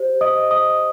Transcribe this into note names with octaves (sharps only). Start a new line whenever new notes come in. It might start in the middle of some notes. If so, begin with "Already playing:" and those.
Already playing: G4 C5
D#5 D#6
D#5 D#6